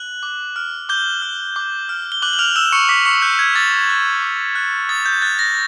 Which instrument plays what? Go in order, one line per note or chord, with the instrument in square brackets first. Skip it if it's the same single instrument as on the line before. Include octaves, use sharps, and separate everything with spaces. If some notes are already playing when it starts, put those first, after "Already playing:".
Already playing: [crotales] F#6 F#7
D6
F6
D6 G6 G7
F6
D6
F6
G7
D6 F#6 F#7
F#7
F6 F7
E6 F#6 E7
C#6 C#7
D6 B6
C#6 C#7
F#6 G6
G#6
D6 A6
F#6
D6
F#6
D#6 A6
G6
F#6 A6
A#6